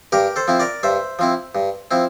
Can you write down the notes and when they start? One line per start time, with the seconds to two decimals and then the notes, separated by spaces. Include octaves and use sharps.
0.12 G2 G4 A#4
0.36 A4 C5
0.48 F3 C4 E4
0.60 A#4 D5
0.83 G2 C5 E5
1.19 F3 C4 E4
1.55 G2
1.91 F3 C4 E4